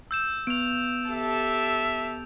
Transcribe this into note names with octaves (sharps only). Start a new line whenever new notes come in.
E6 G6 E7
B3 D7 F7
G4 A4 E5 A5